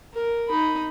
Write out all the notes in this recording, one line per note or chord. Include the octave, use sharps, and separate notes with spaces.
A#4
D#4 B5